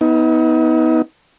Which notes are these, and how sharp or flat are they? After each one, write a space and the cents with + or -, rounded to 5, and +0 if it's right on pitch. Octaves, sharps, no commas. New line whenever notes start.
B3 +0 D#4 +35